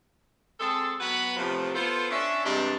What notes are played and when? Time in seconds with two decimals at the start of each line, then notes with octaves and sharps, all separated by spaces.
0.59 G#3 C4 G#4 A4
0.99 F#3 B3 F#4 B4 F#5 B5
1.36 A2 C3 E3 F3
1.74 B3 F4 A4 C5
2.10 C#4 D4 E5
2.44 G2 C3 E3 G#3 C4 D4